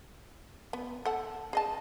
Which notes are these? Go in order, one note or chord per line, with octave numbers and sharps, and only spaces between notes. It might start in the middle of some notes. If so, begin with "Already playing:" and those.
B3
A4 F#5 A5
G#4 D#5 A5